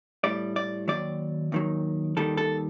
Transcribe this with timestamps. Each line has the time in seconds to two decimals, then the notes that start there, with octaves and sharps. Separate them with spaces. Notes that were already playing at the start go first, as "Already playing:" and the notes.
0.24 A2 G3 D5
0.56 D5
0.88 D#2 D#3 F#3 D5
1.52 D#2 D#3 F#3
2.17 D#2 D#3 G3 A4
2.37 A4